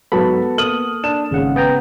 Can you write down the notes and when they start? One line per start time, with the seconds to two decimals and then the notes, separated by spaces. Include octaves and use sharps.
0.12 G#2 F#3 B3 F#4 A4 B5
0.58 A#3 A4 D#6 F6 F#7
1.04 D4 E7
1.31 G#1 C#3 G#3 F#5
1.56 B3 G5 A#5